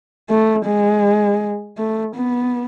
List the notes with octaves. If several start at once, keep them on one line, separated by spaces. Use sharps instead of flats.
A3
G#3
A3
B3